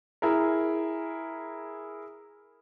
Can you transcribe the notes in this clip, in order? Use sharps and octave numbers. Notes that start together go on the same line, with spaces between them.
E4 G#4 A#4